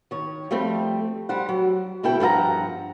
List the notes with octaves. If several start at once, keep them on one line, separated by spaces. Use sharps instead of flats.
D#3 C#5
F3 G3 A3 C4
G3 C5 F#5
F#3
D2 B2 E4 A4 G5
G2 F3 A4 F#5 A#5